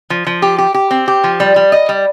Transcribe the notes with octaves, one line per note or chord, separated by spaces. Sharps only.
F3
F3
G4
G4
G4
C4
G4
F3
G3
G3
D#5
G3